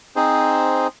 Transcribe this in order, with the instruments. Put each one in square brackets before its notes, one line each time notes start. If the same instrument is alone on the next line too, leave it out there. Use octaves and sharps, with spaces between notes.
[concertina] C4 D#4 G#4 C5